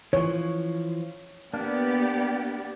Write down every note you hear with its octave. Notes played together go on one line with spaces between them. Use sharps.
E3 F3 C#5
A#3 B3 D4 G4 D5